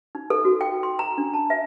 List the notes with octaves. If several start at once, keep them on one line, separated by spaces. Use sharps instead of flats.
D#4
A4
F#4
G5
C6
A#5
D4
A5
E5